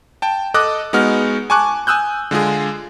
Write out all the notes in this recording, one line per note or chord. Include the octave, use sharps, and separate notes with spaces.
G5 A5
A4 D#5 D6 D#6 F#6
G#3 B3 D#4 F#4 F6
G#5 A5 C#6 D6 F#6
G#5 D#6 E6 F#6 G6
D3 G#3 F4 G#4